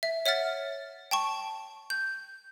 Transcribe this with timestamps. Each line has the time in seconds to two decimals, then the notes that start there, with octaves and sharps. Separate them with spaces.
0.03 E5
0.26 C#5 E5 F#5 F6 A6
1.11 G5 A5 C#6
1.90 G6